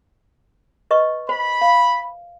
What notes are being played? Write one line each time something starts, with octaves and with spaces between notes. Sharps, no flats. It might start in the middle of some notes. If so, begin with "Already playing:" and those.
B4 D#5 C#6
C5 B5
F5